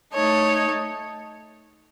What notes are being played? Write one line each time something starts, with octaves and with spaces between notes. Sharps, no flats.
A3 D#4 A4 C#5